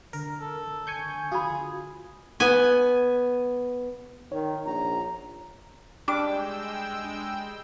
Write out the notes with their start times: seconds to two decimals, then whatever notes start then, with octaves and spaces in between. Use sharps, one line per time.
0.13 D3 A#4
0.41 A4
0.87 G#5 C#6 G6
1.32 F4 F#4 G#4 G#5 B5
2.40 B3 G#5
4.32 D#3 C#5
4.66 A#1 A#5
6.08 G3 G#3 D4 G5 D6 E6